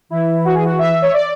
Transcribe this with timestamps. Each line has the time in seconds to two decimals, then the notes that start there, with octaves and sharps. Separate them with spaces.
0.10 E3 E4
0.45 F#4
0.54 G#4
0.64 F#4
0.79 E5
1.02 C#5
1.13 D5